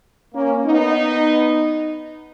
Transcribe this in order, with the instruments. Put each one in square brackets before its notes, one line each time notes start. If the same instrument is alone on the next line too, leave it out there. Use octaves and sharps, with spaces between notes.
[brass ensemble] A#3 C#4
B3 D#4